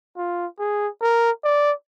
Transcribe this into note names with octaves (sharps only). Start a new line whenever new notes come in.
F4
G#4
A#4
D5